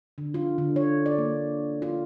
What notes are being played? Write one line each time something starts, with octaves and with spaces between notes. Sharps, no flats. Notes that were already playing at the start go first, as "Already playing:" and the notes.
D3
F4
D3
C#5
D5
A#3
F4